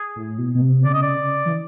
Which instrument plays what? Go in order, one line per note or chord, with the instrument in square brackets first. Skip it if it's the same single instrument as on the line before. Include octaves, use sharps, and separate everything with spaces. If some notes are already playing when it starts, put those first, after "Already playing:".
Already playing: [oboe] G#4
[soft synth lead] A2
B2
B2
C3
[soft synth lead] C#3 [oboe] D5
[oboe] D#5
D5
[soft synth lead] E3